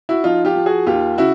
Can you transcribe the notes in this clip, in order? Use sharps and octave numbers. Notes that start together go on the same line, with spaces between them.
E4 F#4
F3 D#4 F4
F4 G4
F3
F#4 G#4
D#2 F4 G4
C#3 E4 F#4